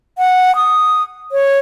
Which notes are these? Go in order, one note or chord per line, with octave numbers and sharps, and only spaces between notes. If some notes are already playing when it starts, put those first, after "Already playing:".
F#5
D#6
C#5